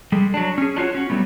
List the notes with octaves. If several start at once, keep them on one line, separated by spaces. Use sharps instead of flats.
G3 G#3 A4
F#3 D4
C#4 G#4
D4 F4 F#4 C#5
C#4 F#4
F#3 G3 A3 B3